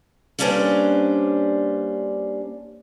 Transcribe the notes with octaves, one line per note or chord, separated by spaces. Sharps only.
G3 A#3 C#4 D4 B4 C5